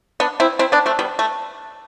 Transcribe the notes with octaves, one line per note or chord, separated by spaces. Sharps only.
B3 D4
C4 E4
C4 E4
B3 D4
A3 C4
G3 B3
A3